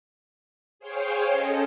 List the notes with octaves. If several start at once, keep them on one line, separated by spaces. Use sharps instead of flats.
G#4 C5 C#5 F5 G5 G#5
C#4 A4 D#5